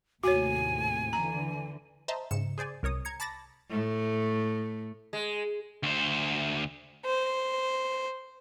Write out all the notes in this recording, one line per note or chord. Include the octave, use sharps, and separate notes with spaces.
D#2 A2 C3 F#4 C#5 G#5
D3 E3 A#5
C5 D#5 E5 A5 A#5
G#2 C#3 C#7 E7
G#4 C5 D5 G#5
C2 A#4 C#5 D#6
A#5 G#6 C#7
A5 B5 D6 A6 A#6
A2 A3
G#3
D2 C5
C5